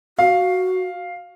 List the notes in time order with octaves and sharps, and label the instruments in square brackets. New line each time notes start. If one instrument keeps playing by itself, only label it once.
[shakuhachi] F#4 [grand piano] F5